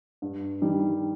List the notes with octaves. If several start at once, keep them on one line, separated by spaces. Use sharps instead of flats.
G2
D#3 G3 D4